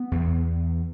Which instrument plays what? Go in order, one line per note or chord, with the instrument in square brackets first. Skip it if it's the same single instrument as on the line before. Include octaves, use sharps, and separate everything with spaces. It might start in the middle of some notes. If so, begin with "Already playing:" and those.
Already playing: [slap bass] B3
E2